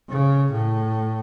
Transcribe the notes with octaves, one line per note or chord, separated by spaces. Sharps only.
C#3
A2